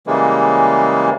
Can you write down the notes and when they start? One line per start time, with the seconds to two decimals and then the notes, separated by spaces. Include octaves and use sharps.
0.07 C#3 E3 G3 G#3 A#3